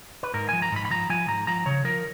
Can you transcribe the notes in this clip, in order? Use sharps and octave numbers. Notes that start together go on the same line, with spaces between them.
B4
G#2 A#4
F3 G#5
A#5
G#2 B5
B5
F3 A#5
F3 G#5
G#2 A#5
F3 A#5
C#3 C#5
F3 A#4